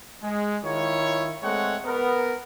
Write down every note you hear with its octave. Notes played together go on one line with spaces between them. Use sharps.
G#3
D#3 E4 F4 C#5
G#3 A3 C4 C#5 F#5
B3 A#4